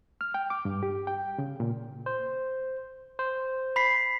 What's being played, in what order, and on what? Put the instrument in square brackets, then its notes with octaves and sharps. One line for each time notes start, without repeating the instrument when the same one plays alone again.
[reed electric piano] F6
G5
D6
G2
G4
G5
C#3
A#2
[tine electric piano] C5
C5
[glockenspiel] B5 B6 C7